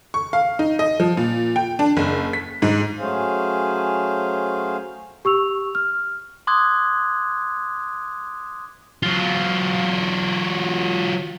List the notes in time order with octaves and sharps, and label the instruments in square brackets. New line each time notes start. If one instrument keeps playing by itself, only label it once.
[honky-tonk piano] C#6
F5
D#4
D#5
F3
A#2
G5
D4
F#1
B6
G#2
[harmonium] F#3 A3 C#4 G#4 C5 F5
[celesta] G4 C#6 E6 F7
F6
[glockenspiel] C6 D6 D#6 F#6 G#6
[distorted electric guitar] F#3 F4